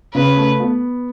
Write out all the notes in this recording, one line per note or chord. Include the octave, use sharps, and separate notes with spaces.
C#3 B4
A3
B3